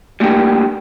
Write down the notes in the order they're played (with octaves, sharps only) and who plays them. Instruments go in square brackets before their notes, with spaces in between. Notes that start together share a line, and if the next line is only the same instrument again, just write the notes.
[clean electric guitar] G3 A3 A#3 D4 G4